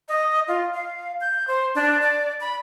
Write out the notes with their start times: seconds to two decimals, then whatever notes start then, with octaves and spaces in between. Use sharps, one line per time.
0.08 D#5
0.48 F4
0.74 F5
1.21 G6
1.48 C5
1.75 D4
2.02 D5
2.41 B5